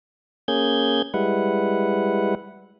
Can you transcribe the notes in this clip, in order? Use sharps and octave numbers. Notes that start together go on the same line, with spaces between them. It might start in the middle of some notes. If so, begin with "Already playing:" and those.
A#3 C#4 G#4 G6 G#6
G3 G#3 E4 B4 F#5